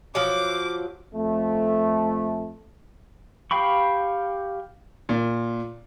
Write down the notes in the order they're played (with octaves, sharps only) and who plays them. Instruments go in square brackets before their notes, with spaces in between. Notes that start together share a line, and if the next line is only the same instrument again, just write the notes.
[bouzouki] F3 F#3 [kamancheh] D6
[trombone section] F2 A3
[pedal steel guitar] G4 F5 G5 B5 C#6
[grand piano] A#2